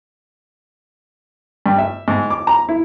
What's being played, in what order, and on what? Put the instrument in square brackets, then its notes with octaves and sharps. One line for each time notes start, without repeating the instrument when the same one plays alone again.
[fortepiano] G2
E5
G#2
D6
A#5
E4